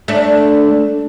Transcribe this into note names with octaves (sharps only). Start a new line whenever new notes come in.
A3 D4